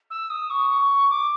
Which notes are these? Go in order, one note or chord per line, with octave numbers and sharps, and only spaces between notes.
E6
D#6
C#6
C#6
D6